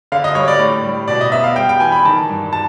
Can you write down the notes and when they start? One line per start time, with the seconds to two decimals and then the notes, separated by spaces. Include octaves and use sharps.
0.12 D3 F5
0.24 D#5
0.35 G3 C#5
0.48 D5
0.59 A2
0.84 G3
1.08 B2 D5
1.21 D#5
1.32 B3 E5
1.44 F5
1.56 G3 G5
1.69 G5
1.80 E3 G#5
1.92 B5
2.05 D#3 A5
2.29 G2
2.53 A5